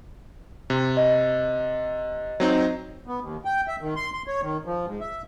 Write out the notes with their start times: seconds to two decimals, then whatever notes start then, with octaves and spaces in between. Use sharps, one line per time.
0.70 C3
0.97 D#5
2.40 F#3 C4 D#4
3.07 B3
3.20 D#2
3.45 G5
3.68 E5
3.81 D#3
3.96 C6
4.13 C6
4.27 C#5
4.42 D#3
4.66 F3
4.86 G#2
5.01 E5